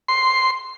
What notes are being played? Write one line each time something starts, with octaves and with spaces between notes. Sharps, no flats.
C6